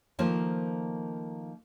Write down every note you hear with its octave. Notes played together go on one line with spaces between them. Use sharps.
D#3 F3 A3 A#3 C5